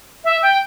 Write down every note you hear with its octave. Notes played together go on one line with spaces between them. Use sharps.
E5
G5